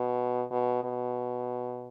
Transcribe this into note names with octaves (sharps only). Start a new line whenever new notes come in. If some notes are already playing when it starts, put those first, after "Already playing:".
Already playing: B2
B2
B2